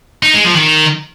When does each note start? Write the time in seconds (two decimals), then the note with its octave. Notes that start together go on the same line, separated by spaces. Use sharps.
0.23 D#4
0.34 G#3
0.45 F3
0.56 D#3